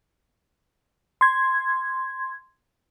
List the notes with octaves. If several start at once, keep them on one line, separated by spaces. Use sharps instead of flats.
C6 G#6